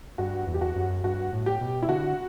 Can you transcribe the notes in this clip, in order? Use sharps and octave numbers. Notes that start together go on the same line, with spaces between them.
G2 F#4
E2
G4
F#4
F#2
G2 F#4
A2
G4
B2
E4
D3 F#4